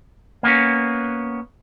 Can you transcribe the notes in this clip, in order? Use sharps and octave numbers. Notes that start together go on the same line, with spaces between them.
A#3 B3 C#4